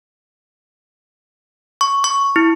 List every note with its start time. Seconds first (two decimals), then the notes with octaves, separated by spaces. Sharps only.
1.81 C#6
2.04 C#6
2.36 E4